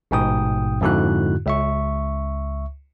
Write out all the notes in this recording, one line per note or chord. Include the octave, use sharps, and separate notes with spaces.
A1 G#2 B2 G5 D#6
F2 G#2 D3 E4 F#4 F#6
C#2 E5 C#6